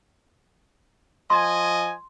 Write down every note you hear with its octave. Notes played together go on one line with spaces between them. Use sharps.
F3 D#5 G#5 C6